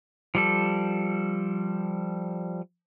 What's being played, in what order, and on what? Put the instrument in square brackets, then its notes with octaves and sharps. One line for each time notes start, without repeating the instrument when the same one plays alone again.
[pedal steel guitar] F3 G3 A4